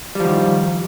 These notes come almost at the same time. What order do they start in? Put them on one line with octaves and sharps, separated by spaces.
G3 F3 D#3